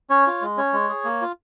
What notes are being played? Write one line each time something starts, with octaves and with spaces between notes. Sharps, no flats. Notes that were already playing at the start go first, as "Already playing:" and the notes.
C#4 C#5
F4
G#3
C#4 C#5
G#3
G#4
A#3
F4